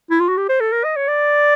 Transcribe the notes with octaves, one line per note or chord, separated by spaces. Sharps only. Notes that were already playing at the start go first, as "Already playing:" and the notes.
E4
F4
F#4
G4
C5
A4
A#4
D#5
C#5
D5